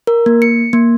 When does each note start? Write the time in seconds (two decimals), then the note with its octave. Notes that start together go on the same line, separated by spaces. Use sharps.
0.07 A#4
0.26 A#3
0.42 C#7
0.73 A#3